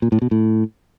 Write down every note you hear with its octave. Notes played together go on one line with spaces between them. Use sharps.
A#2
A2
B2
A2